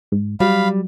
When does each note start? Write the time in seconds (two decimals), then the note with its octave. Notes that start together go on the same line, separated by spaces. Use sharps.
0.12 G#2
0.40 F#3 G3 F5 B5